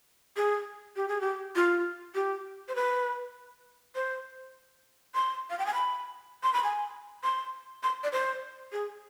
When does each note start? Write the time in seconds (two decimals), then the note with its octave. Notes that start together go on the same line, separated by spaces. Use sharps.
0.36 G#4
0.96 G4
1.08 G#4
1.21 G4
1.55 F4
2.15 G4
2.68 C5
2.75 B4
3.95 C5
5.14 C6
5.50 F5
5.59 G5
5.66 G#5
5.74 B5
6.43 C6
6.53 B5
6.64 G#5
7.23 C6
7.83 C6
8.03 D5
8.12 C5
8.72 G#4